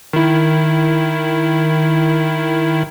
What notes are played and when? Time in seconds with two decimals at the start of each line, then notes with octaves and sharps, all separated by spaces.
0.13 D#3 E4